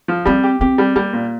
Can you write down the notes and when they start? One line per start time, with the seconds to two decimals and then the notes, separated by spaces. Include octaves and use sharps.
0.08 F3
0.26 G3 C4
0.43 G4
0.61 C4 G4
0.78 G3
0.96 G3 A#3
1.13 A#2